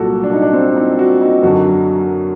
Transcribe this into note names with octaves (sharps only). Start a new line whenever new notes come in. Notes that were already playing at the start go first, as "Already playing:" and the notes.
Already playing: C2 A#2 F#3 F#4 A4
D4
D#4
D4
C4
D#4
F#4
D#4
F#2 D3 F#3 F#4